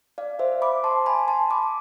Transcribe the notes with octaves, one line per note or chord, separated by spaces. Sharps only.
D5 F5
C5 E5
B5 D6
A5 C6
G#5 B5
A5 C6
B5 D6